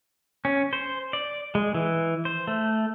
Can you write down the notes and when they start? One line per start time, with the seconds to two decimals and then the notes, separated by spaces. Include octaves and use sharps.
0.45 C#4
0.73 C5
1.13 D5
1.55 G#3
1.75 E3
2.25 C5
2.48 A3